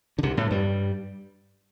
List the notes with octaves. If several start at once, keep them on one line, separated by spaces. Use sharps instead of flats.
D3
C2 C3
A2 A3
G2 G3